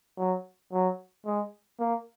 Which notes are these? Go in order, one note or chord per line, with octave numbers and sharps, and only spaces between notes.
F#3
F#3
G#3
A#3